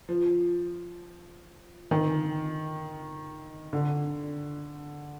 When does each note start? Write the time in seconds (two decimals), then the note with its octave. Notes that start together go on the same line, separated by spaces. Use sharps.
0.09 F3
1.91 D#3
3.73 D3